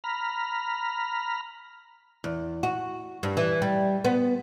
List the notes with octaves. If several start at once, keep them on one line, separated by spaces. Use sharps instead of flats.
A#5 B5 F6
E2
F#4
G2
E3
G3
B3